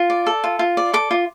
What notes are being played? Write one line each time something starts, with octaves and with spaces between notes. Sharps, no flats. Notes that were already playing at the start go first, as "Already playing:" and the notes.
Already playing: F4
D5
A4
F4
F4
D5
A4 D6
F4